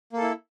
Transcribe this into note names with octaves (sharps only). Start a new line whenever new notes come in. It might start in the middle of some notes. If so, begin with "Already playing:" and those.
A#3 E4 A4